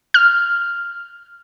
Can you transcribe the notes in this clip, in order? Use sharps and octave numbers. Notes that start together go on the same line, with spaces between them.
F6